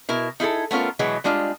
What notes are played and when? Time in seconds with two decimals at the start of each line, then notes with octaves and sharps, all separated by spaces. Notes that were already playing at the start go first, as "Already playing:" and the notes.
0.09 B2 E4 A#4
0.40 D#4 E4 G#4 A4
0.71 A3 B3 C#4 F4 A#4
0.99 B2 E3 F#3 G#3 B3
1.24 G3 G#3 D4 F4 D#5